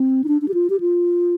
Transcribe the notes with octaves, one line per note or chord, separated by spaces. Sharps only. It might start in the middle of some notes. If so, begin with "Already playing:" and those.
Already playing: C4
D#4
D4
D4
G4
F4
G4
F4